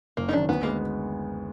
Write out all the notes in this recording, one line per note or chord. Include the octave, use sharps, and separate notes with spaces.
F#1 A#3
D#4
F#2 D#3 D4
D2 B3
G#3 A#3 B3